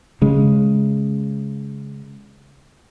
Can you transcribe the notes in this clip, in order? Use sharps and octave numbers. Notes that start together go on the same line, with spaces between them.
C#3 G#3